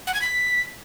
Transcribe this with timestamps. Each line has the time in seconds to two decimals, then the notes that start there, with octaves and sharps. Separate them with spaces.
0.07 F#5
0.14 G#6
0.21 B6